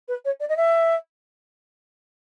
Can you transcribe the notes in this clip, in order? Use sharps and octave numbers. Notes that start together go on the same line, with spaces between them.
B4
C#5
D5
D#5
E5